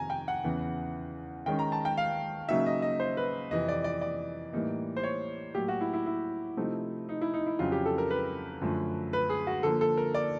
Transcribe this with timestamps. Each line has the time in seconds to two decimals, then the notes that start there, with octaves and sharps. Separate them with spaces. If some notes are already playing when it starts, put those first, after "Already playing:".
Already playing: F2 C3 D#3 G#5 A#5
0.10 G5
0.28 F#5
0.44 E2 C#3 E3
1.46 D#3 G#3 C#4 G5
1.59 A#5
1.72 A5
1.85 G5
1.98 F5
2.48 C#3 F#3 A#3 D#4 E5
2.66 D#5
2.82 D#5
3.00 C5
3.17 B4
3.51 F2 C3 E3 D#5
3.68 D5
3.84 D5
4.01 D5
4.53 A2 E3 G3 A#3 D#4
4.97 C5
5.03 C#5
5.55 A2 F#3 A#3 G4
5.68 F#4
5.81 E4
5.93 E4
6.06 E4
6.57 C3 F3 A3 C4 D#4
7.09 D#4
7.21 E4
7.34 D#4
7.47 E4
7.59 F2 C#3 F#3 F4
7.72 G4
7.86 A4
7.98 A#4
8.11 B4
8.61 F#2 D3 F3 A3
9.13 B4
9.30 G#4
9.47 F#4
9.63 D3 F3 A#3 A4
9.81 A4
9.97 A#4
10.14 D5